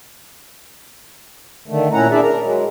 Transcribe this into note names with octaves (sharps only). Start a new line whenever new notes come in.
D3 D#3 A3
A#2 C#4 E4 F#5 A#5
A#2 D4 E4 G#4 D5 E5
A#4 A#5
F#3 G#3